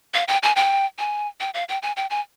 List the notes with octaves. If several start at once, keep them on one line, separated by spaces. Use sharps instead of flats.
F5
G5
G#5
G5
G#5
G5
F5
G5
G#5
G5
G#5